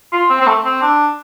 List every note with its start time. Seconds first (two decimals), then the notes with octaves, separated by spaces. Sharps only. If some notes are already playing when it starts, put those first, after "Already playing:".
0.12 F4
0.30 C4
0.41 C4
0.47 A3
0.65 C4
0.82 D4